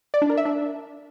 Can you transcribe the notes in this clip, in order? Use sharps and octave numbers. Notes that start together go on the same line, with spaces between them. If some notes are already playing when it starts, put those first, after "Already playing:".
D5
D4
A#4
E5
D4